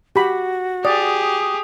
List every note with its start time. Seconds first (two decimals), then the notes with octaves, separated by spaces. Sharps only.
0.16 F#4 G4 B5
0.85 G4 G#4 D5 D#6